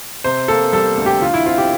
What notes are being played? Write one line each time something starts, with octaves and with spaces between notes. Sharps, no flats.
C3 C5
A#3 A4
G3 A4
D2
G4
D3 F4
E4
C4 F4
G4